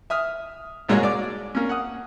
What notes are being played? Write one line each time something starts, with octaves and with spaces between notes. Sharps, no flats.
E5 D#6 F6
C2 G#2 G#3 A#3 F#4 C#5
D5 D6
A#3 C#4
F#5 D#6